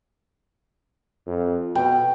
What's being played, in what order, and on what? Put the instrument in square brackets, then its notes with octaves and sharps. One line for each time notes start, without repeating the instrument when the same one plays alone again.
[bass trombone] F2
[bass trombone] B2 [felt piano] G5